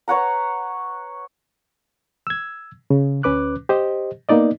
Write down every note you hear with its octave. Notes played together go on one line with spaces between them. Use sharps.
B4 C#5 F#5 A#5
E6 G#6
C#3
D2 C#4 B4 D6 F#6
G4 C5 D#5
A#3 B3 D#4 D5 D#5